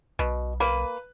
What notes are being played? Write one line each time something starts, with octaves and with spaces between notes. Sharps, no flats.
B1 B2
A#3 B4